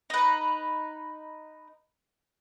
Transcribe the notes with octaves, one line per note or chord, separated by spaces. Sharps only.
D#4 B4